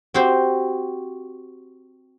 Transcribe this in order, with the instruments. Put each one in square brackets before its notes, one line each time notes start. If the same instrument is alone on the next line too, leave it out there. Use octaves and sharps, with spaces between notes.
[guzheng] C4 F#4 G4 C5